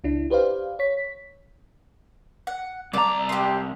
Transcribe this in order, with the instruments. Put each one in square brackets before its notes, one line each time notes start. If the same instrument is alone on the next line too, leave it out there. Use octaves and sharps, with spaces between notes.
[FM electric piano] C#2 D4 E4
G4 B4 C5 D5 F5
C#5 B6
[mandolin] F#5
[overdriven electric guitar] C2 A#5 [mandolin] D5 A5
[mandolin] G4 C6